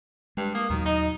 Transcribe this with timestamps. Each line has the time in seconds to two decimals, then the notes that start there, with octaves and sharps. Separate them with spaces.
0.37 G2 G#3
0.54 A#3 D#6
0.70 D#2 A#2 D#3 F#3
0.86 D#4 D#5